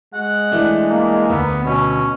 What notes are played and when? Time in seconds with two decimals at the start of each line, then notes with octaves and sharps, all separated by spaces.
0.14 G#3 F#5
0.51 E3 A3 D4
0.89 A#3
1.29 D2 B3
1.65 B2 C#4